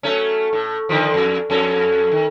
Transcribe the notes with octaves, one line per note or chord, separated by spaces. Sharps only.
F#3 A3 C#4
A2
D3 D#3 F3
F2
F2 C#4 A4
D#3